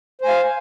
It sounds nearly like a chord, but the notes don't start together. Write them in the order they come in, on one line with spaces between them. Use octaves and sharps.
C5 G#5 F5